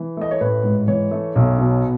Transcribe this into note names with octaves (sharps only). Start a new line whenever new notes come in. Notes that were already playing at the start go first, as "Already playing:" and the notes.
Already playing: E3
A3 D#5
C#5
A1 B4
G#2
E3 C#5
A3
B1
B2